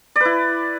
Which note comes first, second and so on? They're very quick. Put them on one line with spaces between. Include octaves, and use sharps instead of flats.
D5 B4 E4